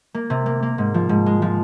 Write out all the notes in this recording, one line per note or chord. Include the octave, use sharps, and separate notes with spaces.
A#3
C3
A#3
A#3
G#2
F3
G#2
G#3
F3